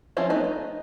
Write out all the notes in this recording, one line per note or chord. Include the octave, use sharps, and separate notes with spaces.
F3 C4 C#4 E4 F4
A3 B3 D#4
D#4